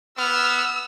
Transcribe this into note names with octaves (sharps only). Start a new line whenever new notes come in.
B3 E6 F6